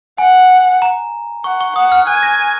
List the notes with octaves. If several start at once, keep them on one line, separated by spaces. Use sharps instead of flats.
F#5 G#5
A#5
F#5 C#6
C#6
F#5 D#6
F6
G#5 F#6
A#6